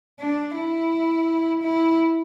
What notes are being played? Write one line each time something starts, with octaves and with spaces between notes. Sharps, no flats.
D4
E4
E4